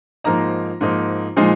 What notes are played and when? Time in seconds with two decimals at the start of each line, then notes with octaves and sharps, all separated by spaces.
0.24 G#2 F3 A#3 D#4 A#5
0.81 G#2 F3 A#3 D#4
1.36 A#2 F3 G#3 D#4